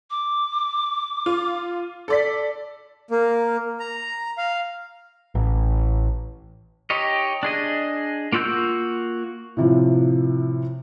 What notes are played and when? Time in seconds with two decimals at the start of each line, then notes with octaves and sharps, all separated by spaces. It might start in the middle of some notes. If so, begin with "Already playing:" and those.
0.10 D6
1.26 F4
2.08 A4 D5 B6
3.11 A#3
3.80 A#5
4.38 F5
5.35 A1
6.90 D#4 G4 C#5 D#5
7.43 D4 G#4 D#5
8.32 A#3 F4 F#4 E6 G6
9.57 A2 C3 F3